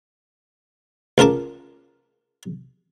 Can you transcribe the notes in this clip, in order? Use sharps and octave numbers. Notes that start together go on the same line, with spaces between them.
C#2 F4 A#4 A5 D6